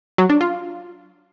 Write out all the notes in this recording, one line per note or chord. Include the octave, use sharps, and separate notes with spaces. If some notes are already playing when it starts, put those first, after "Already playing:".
F#3
D4
F4